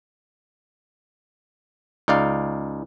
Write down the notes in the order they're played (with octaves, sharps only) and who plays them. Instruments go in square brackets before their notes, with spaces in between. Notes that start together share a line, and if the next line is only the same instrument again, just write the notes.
[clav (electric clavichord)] C#2 D#4 D5 F5